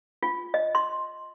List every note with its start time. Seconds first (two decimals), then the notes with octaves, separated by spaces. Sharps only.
0.23 F4
0.54 D#5
0.75 C6